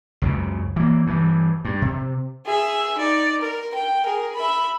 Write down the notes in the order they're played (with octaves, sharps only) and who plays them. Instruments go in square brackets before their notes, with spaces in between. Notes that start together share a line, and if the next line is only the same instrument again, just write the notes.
[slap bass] C#2 F#2 C#3
E3 A#3
G2 E3
G2
C3
[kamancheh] G#4 E5
D#4 D5
A#4
G5
G#4 A#4
E5 B5